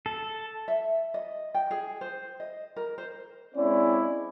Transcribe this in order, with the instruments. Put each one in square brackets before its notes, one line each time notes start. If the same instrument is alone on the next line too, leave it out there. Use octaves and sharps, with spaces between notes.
[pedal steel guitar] A4
[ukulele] E5
D#5
G5
G#4
C5
D#5
A#4
C5
[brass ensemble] G#3 C4 C#4 E4 D5